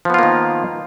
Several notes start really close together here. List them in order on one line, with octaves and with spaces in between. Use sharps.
F3 B3 F4 A#3 D#3